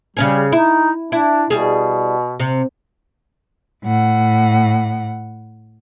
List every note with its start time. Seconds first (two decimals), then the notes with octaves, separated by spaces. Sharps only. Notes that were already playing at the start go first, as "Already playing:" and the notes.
0.17 C#3 G3 C#4 G#4
0.52 D#4 E4
1.12 D4 E4
1.50 B2 G3 G#4
2.40 C3
3.85 A2 F#5